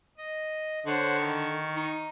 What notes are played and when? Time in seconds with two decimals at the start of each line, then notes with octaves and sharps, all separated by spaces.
0.17 D#5
0.86 D3 C5 C#5 F#5
1.17 D#3 C#6
1.76 D#4